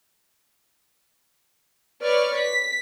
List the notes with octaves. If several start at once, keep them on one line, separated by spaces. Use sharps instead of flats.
B4 C#5 D5 C#6 F6
B6